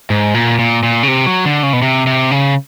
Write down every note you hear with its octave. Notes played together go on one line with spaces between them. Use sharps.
G#2
A#2
A#2
A#2
C#3
C3
F#3
D3
C#3
B2
C3
C3
C#3